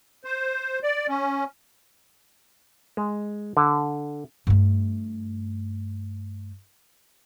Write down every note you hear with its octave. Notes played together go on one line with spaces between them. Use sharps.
C5
D5
C#4
G#3
D3
G2 A3